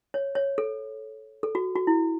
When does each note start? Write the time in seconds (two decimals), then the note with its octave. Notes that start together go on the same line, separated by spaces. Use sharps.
0.14 C#5
0.35 C#5
0.58 A4
1.43 A4
1.55 F#4
1.76 F#4
1.87 E4